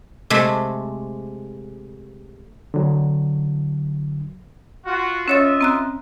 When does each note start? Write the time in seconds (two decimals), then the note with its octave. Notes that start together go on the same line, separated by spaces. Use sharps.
0.30 C3 G#3 A3
2.74 D3 F#3
4.87 F4 F#4
5.28 C#4 F4 C#5 D#5 E5 A6
5.61 C4 A#5 F#6